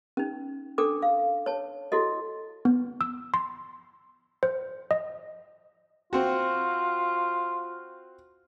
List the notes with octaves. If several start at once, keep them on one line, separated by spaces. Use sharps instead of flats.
C#4 D#4
D4 A4 G5 D6
F5
C#5 A5
E4 F#4 A4 D#5
B3
E6
C6
C5
D#5
C4 F4 F#4